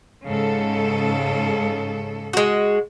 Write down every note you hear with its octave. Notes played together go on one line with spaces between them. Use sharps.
G#2 C#3 A4
G#3 F#4